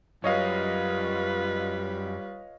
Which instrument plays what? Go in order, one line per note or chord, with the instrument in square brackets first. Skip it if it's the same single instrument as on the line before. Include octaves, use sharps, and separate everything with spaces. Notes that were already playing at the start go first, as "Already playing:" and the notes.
[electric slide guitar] F#2 [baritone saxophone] G3 [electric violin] F4 B4 [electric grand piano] C#5 D#5 F5